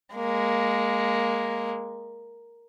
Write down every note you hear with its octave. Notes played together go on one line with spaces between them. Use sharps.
G#3 A#3